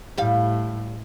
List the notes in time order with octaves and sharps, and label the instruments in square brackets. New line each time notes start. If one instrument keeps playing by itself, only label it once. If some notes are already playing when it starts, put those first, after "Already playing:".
[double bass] A2 [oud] G3 F5